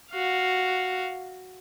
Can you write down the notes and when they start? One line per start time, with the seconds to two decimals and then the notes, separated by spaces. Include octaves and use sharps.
0.11 F#4 F5